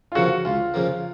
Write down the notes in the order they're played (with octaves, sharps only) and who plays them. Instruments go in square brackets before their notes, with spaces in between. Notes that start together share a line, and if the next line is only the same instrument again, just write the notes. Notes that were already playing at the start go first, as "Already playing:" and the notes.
[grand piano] F4
[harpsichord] C#3 F3 A#3 [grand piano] F#4
[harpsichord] C#2 [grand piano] F4
[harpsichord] C#3 F3 A#3